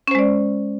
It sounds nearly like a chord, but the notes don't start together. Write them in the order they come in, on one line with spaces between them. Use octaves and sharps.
C#4 C5 G#3 D5